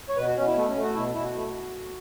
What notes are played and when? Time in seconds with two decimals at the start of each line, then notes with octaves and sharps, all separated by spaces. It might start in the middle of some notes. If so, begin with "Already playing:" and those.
0.09 C#5
0.17 B2 B4
0.27 F#4
0.36 B2 C#4
0.47 E4
0.56 A3 B3
0.69 C#4
0.76 A3
0.83 F#4
0.95 B2 E4
1.15 B2 E4
1.24 F#4
1.34 A3